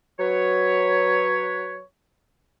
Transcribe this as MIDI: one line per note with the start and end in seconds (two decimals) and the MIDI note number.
0.20 1.80 54
0.20 1.80 71
0.20 1.80 73